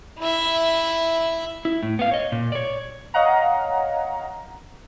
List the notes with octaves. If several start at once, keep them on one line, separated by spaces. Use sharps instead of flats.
E4 E5
E4
A2
B3 F5
C#5 D#5
A#2
C#5 D5
C#5 D#5 F5 F#5 A#5